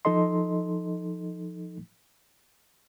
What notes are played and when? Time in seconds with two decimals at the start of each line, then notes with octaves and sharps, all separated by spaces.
0.05 F3 D#4 A4 D#5 C6